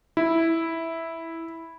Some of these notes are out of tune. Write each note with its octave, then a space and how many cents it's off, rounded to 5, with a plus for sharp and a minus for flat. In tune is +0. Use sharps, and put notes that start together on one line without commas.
E4 -5